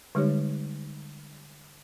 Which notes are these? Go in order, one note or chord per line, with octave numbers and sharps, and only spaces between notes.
D3 G3 G#3 D#4 G4 C#5